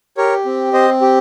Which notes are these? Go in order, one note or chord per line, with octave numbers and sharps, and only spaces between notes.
G4 A#4 C#5
C4
C4 C5 D#5
G4